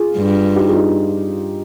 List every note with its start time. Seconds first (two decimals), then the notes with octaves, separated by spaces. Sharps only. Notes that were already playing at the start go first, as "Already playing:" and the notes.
Already playing: F4 G#4
0.17 G2
0.56 D#4 G4
0.67 F4 G#4
0.76 D#4 G4